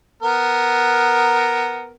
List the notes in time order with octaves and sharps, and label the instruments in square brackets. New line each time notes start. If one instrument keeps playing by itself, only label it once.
[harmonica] B3 A#4